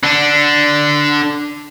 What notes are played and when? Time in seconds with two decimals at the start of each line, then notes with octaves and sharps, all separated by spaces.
0.03 D3 D4